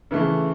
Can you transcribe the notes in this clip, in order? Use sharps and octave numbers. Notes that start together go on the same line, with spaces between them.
C#3 E3 A3